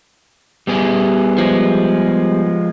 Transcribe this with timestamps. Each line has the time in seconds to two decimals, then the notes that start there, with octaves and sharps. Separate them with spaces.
0.67 G3 B3 G#4
1.38 F3 G#3